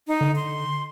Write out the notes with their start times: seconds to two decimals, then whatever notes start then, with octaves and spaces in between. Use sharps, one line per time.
0.08 D#4
0.21 D3
0.36 C6